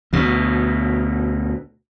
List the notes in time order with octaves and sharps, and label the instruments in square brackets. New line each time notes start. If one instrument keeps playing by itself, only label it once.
[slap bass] D2 B2